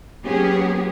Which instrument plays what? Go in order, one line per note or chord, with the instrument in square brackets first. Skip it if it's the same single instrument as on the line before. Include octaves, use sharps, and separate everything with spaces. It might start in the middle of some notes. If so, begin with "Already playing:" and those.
[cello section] F#3 A#3 B3 C#4 G4 G#4